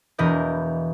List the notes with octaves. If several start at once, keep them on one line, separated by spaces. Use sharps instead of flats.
E1 E3 E4 A#4 D#5 G6